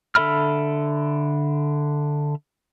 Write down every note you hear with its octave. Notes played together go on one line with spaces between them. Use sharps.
D3 A4 E5 B5 F6